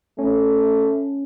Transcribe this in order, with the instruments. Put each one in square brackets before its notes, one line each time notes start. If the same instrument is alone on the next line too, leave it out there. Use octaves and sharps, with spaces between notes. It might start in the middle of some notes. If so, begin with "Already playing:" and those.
[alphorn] A3 [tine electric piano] C#4